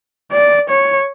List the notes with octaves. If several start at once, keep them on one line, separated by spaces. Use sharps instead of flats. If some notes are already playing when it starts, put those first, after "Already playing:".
D5
C#5